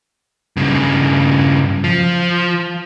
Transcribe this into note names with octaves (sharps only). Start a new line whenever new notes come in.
G2 C#3
F3